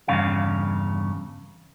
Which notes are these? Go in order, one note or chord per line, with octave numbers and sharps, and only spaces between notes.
E2 G2 C#3 F5